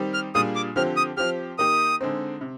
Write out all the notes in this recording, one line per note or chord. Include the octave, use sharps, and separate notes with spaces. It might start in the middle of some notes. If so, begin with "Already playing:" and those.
Already playing: D#3 G3 C4 G4
F6
A#2 G3 D4 F4 G#4 D#6
D6
D3 F3 C4 G4 F6
D#6
F3 C4 G4 F6
D#3 A#3 D#4 G4 D#6
D3 G#3 C4 D#4
C3